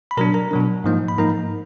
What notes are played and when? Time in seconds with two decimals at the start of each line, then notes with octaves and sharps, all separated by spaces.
0.11 B5
0.17 B2 F#3 D4 A#4 A#5
0.34 A#4 A#5
0.51 B2 F#3 D4
0.84 G#2 F3 A#3 D#4
1.08 B5
1.18 G#2 F3 A#3 D#4 A#4 A#5